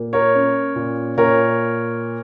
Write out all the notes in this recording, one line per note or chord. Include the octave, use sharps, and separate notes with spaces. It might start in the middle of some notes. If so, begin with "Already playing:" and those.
Already playing: A#2 A#3
A#4 C#5
C#4
A#2
A#2 A#4 C#5